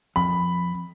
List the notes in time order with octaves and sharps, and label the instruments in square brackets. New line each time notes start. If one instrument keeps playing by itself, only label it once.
[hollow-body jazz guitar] F2 [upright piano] B5